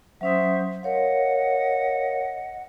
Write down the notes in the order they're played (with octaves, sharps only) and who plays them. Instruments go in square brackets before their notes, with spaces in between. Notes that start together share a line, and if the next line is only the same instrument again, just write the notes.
[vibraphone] F#3 C#4 D#6 [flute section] C5 E5
[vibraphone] A#4 C#5 F5 [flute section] D#5 F#5